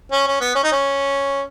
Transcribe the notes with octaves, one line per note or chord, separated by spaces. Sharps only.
C#4
C#4
B3
C#4
D#4
C#4